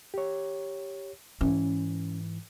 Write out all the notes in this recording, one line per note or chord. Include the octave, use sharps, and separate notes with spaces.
G4 C#5
G#2 E3 C#4